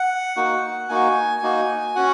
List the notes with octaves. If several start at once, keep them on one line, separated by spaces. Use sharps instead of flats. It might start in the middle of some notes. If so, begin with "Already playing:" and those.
Already playing: F#5
A#3 D#4 F#4
A#3 D#4 F#4 G#5
A#3 D#4 F#4
C#4 F#4 F#5